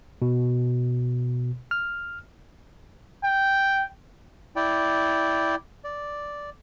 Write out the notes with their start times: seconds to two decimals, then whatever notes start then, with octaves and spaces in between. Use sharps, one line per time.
0.22 B2
1.71 F6
3.24 G5
4.56 E4 D5 G5
5.84 D5